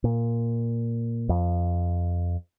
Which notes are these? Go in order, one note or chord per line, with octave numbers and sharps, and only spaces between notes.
A#2
F2